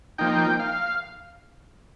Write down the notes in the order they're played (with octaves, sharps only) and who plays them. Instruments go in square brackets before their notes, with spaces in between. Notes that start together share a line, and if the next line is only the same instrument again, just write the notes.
[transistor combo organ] F3 A#3 D#4 G5
F5